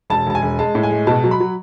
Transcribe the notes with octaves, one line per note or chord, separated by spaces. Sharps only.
E1 A5
E1 A5
G#5
E1
G#3 A5
A2
G#5
G#3
B2 A5
F#3
B5
F#3